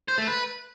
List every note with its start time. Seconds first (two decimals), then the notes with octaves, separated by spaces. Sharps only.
0.08 C5
0.18 A3
0.27 B4